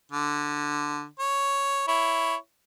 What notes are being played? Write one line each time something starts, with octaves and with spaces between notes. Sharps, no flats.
D3
C#5
E4 C#5